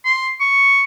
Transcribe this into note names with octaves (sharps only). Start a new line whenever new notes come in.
C6
C#6